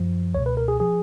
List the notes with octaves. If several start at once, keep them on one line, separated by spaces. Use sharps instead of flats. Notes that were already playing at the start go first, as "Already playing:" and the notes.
Already playing: F#2 F3
C#2 B2 C#5
B4
A#4
G#4
F3 G#4